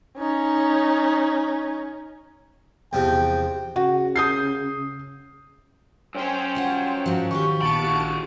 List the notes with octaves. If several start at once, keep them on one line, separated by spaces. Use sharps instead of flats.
C#4 D#4
E2 C3 F3 G5
C#3 F#4
D#6 G6 C7
F#2 C#4 C5 C#5 G5
G3 F4 F#5
G#2 F3 F#4
D#3 F4 G4 C#6
A#1 B3 A5 B5 D7
E4 F#4